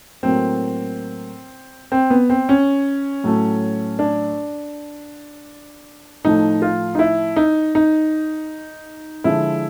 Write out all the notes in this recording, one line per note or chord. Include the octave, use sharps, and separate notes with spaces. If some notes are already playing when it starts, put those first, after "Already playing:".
A2 F#3 A#3 C4
C4
B3
C4
C#4
A2 F#3 A3
D4
A2 F3 A3 D#4
F4
D#4
E4
D#4
D#4
D3 F3 G#3 E4